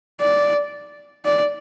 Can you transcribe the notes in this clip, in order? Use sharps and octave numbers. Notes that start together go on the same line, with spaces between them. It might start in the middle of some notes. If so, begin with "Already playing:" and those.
D5
D5